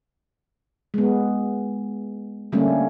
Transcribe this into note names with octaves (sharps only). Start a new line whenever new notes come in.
G#3 B3
D3 G3 A3 A#3 C#4